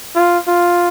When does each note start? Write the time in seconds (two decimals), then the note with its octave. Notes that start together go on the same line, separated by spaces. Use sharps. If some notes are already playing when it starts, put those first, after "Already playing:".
0.15 F4
0.47 F4